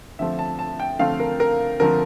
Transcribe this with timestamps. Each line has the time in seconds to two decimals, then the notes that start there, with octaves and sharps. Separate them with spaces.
0.19 D3 F3 A3 C4 E5
0.39 A5
0.59 A5
0.80 G5
0.99 D3 F3 A3 C4 F5
1.20 A#4
1.40 A#4
1.80 D3 F3 A3 C4 A#4